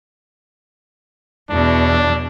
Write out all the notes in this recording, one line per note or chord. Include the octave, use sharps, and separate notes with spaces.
E2 B2 D4